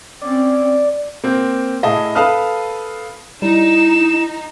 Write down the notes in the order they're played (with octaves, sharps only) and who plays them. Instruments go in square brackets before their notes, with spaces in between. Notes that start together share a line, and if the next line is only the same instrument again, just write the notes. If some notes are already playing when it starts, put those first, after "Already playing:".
[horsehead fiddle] C4 C#4 [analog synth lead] D5
[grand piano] A#3 C4
A2 E4 G#4 D#5 A5
A4 B4 F5 A5 D#6 F6
[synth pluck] G3 [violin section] D#4 [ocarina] E4 [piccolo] E7